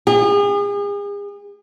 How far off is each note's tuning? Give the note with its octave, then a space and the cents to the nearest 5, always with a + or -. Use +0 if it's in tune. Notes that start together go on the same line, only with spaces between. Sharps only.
G#4 -40